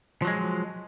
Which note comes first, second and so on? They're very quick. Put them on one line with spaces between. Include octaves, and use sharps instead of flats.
F3 F#3 G#3